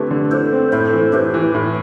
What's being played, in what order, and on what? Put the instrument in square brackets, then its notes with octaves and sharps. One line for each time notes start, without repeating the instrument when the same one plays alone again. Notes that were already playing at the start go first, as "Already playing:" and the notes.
Already playing: [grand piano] D3 A3 C4 E4 [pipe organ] G4 B4
[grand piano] D3
[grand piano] E4 [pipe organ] A4 C5
[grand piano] C4
[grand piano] A2 [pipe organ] A4 C5
[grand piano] E3
[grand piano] A2 [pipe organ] G4 B4
[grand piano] E3
A2